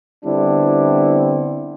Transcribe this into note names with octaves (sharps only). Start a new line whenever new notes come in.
D3 G3 B3 C4 D4 E4